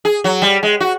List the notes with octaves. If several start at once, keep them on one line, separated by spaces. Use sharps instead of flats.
G#4
F#3
G3
G#3
F#4